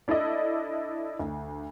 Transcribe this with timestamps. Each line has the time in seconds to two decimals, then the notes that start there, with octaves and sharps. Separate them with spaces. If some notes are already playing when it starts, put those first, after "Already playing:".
0.08 D4 E4 A4 D5 D#5
1.19 D2